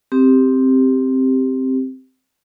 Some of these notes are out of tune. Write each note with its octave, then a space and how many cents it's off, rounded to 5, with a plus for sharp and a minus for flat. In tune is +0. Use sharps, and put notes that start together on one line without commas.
C4 +0 G4 +0